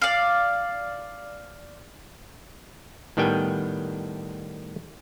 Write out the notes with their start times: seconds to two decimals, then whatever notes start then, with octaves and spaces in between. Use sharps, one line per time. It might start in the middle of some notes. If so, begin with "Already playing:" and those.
0.02 D5 F5
3.17 A2 D#3 G3 B3 G5 G#5